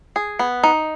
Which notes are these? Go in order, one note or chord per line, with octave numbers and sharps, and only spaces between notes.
G#4
B3
D#4